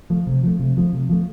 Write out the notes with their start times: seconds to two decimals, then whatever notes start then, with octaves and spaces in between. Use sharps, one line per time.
0.10 F3 A3
0.27 C3
0.43 F3 A3
0.59 C3
0.77 F3 A3
0.93 C3
1.09 F3 A3